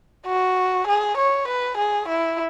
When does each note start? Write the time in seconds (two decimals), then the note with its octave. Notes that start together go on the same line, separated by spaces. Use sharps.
0.26 F#4
0.88 G#4
1.18 C#5
1.48 B4
1.78 G#4
2.09 E4